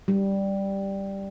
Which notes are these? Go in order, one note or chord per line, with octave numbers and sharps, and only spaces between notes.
G3